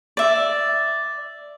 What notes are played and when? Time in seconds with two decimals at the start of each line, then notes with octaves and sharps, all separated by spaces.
0.17 D5 E5